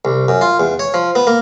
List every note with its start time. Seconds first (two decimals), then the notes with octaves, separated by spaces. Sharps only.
0.05 C2
0.28 F#2
0.41 F4
0.60 E2
0.79 C#5
0.94 F3
1.15 B3
1.27 A#3